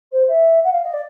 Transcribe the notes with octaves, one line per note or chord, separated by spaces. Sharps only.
C5
E5
F#5
F5
D#5
D5